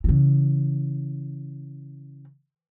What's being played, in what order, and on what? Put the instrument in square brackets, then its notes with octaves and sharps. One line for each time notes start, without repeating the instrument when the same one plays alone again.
[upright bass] C#3 E3